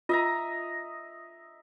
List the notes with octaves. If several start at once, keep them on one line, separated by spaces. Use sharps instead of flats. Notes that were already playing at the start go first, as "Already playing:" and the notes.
F4 D#5 E5 A#5